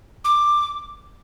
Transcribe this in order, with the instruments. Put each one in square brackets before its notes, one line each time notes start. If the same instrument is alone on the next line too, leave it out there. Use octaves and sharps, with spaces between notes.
[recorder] D6